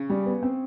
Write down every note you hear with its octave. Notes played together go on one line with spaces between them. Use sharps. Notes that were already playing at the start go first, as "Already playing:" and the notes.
Already playing: C#3
G3
B3
C4